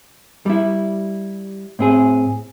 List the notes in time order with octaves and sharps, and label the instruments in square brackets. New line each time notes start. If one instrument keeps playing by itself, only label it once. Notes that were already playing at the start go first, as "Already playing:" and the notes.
[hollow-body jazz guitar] G3 E4
A2 C4 G#4